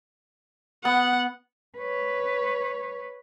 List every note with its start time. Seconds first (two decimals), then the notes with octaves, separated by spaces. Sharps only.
0.85 B3 F#5
1.78 B4 C#5